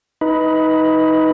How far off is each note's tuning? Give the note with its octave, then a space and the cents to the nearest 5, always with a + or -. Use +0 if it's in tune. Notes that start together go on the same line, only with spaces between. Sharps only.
D#4 +20 B4 +0